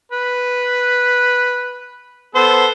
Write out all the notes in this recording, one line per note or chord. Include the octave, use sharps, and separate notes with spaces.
B4
B3 A4 C5